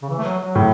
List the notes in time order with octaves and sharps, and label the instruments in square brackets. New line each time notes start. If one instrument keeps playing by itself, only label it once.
[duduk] C#3
E3
A3
F#3
F#3
[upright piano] A2